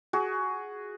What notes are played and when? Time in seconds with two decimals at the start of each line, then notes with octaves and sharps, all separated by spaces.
0.13 F#4 G#4